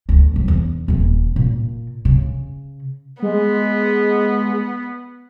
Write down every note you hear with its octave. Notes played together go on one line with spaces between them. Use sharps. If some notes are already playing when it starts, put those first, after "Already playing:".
D2 D#3
F#2 G3
E2
D#1 E3
A#2
C#3
G#3 B3